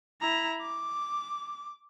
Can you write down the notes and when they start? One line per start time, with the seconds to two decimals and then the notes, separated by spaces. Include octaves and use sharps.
0.21 E4 A#5
0.62 D6